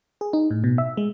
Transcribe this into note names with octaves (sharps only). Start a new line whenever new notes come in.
G#4
D#4
A2
B2
E5
G#3